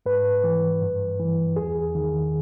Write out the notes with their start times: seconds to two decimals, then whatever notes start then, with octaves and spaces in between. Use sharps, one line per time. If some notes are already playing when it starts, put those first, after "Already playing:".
0.06 G#2 B4
0.44 E3
0.82 G2
1.20 E3
1.56 E2 G#4
1.95 D#3